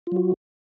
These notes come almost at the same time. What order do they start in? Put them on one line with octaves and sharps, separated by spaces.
F4 F#3 F#4